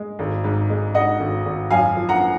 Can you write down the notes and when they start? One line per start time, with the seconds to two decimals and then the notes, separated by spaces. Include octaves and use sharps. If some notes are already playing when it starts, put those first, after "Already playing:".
Already playing: G#3
0.19 G#1
0.44 G#2
0.70 G#3
0.94 G#2 D#5 F#5
1.20 G#1
1.46 G#1
1.71 F#2 F5 G#5
1.96 F3
2.09 F#5 A#5